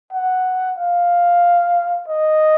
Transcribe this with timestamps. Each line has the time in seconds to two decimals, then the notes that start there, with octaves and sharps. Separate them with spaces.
0.13 F#5
0.78 F5
2.08 D#5